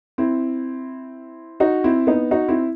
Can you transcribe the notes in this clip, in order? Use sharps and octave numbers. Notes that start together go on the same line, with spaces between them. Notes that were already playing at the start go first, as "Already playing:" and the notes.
C4 E4
D#4 F#4
C4 E4
B3 D#4
D#4 F#4
C4 E4